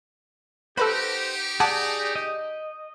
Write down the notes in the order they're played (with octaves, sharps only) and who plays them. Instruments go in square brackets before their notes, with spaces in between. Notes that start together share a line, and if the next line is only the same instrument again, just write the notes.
[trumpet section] D#4 G4 [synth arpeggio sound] A4 B4 B5 [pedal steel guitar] C5 F#5
[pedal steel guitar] G#4 D5 [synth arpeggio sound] F#5 A5 D6
[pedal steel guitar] D#5